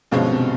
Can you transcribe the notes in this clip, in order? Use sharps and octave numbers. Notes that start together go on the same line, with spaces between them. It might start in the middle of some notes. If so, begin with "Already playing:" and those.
G2 B2 D3 F3 G#3 C#4
C3